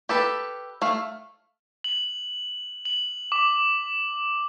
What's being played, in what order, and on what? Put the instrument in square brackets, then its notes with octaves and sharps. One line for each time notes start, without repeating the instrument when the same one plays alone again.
[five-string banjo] G4 A4 B4
A3 F5
[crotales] F#7
F#7
D6